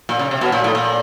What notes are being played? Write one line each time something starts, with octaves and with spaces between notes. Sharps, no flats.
A#2
C#3
C3
B2
A#2
A2
A#2